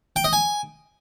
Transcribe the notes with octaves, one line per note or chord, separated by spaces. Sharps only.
G5
D#5
G#5